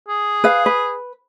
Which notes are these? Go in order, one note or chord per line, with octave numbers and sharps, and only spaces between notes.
G#4
B4 F5
B4